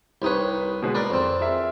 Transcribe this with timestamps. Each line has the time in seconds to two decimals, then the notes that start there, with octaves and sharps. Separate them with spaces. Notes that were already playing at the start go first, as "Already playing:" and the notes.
0.22 C2 D#4 G4 B4 C#5
0.82 B2 G#3 B3
0.95 A#4 B4 D5
1.10 F2 C4
1.41 G#4 A#4 E5